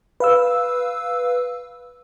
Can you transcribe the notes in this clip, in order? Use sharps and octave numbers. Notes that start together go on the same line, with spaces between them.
B4 F5 E6